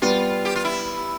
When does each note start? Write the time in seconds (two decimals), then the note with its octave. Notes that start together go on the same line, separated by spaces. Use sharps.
0.02 G3 B3 F4
0.45 G4
0.55 F4
0.65 E4